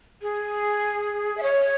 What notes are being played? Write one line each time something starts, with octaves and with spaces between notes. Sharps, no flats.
G#4
E5
C#5